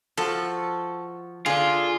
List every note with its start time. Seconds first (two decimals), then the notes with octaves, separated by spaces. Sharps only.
0.17 F3 F#4 A4
1.46 D3 D4 F4 G#4